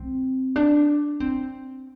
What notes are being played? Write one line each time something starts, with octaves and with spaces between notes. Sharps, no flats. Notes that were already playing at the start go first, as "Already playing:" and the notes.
Already playing: C4
D4
C4